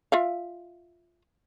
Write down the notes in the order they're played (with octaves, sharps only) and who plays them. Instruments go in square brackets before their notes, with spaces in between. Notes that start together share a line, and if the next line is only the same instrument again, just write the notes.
[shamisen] F4 E5 F5